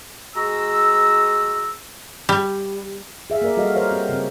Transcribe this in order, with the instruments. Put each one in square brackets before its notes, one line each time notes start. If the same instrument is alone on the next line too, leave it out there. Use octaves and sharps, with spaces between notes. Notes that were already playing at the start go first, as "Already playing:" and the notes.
[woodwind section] G#3 F#4 A#5 E6
[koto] G3
[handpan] G#4 E5 F5
A#3 A#4 D5
G3 F#4 A4 D#5 F5
A#4 C5 C#5 F5
C4 G4
C#3 C4